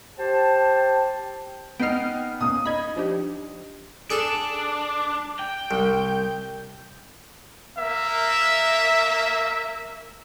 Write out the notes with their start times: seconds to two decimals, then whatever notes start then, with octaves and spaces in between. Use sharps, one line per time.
0.18 G4 C5 A5
1.80 B3 D#4 G5 F6 C7
2.41 B2 A#3 C#4 D#6
2.66 D#4 B5 G#6
2.96 F3 D4 G4
4.10 D4 G#4 A4
5.39 G5
5.71 C2
7.78 A#3 E5